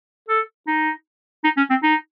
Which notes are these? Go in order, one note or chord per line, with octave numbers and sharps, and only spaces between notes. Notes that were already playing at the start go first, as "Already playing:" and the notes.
A4
D#4
D#4
C#4
C4
D#4